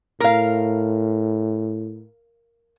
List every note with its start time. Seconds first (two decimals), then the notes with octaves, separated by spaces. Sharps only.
0.20 A2 A#4 F5